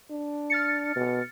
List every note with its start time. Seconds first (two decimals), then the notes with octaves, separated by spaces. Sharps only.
0.11 D4
0.50 F6 A6 C#7
0.96 B2